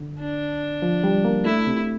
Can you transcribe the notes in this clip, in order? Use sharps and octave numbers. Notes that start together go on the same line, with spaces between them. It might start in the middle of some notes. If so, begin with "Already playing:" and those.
Already playing: D3
D4
F3
G3
A#3
A3 E4
C3